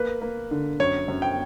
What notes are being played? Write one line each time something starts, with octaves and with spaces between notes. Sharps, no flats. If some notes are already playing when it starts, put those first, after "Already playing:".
Already playing: A#3 B4
A#3
D3
F#2 C#5
F#2
G5